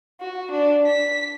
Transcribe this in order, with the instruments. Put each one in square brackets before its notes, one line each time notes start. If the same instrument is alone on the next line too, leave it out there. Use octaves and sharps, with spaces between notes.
[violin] F#4
D4
B6